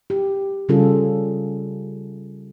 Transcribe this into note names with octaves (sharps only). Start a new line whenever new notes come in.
G4
C#3 G3 C#4 F4 G#4 A4